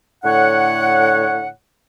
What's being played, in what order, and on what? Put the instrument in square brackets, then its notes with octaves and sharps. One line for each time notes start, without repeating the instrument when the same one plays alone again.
[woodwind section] A2 D3 C#5 F#5